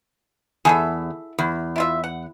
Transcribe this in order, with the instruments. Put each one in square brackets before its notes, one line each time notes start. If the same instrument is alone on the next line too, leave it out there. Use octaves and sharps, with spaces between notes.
[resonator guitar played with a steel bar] E2 [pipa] G#4 A4 E5
[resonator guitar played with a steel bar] E2
[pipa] E4 F4 E5
F#5